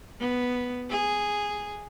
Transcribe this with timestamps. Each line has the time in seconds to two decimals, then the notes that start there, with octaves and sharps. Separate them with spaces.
0.20 B3
0.90 G#4